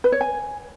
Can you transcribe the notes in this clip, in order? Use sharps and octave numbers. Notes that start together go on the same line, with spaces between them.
B4
C#5
G#5